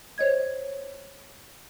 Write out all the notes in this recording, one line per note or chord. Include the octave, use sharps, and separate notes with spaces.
C5 C#5 D#5 G#6